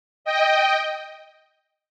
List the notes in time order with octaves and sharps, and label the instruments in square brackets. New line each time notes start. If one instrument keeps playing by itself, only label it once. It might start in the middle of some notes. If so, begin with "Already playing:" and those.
[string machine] D#5 G5